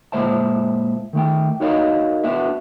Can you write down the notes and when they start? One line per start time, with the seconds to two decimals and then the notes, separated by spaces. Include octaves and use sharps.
0.12 A#2 G#3 C5 E5 A5
1.13 D#3 A3 G5
1.60 D#4 F#4 A#4 C#5 D#5 F5
2.23 B3 D4 F#4 E5